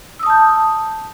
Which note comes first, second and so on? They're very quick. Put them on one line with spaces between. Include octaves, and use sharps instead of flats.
E6 D#6 A5 G6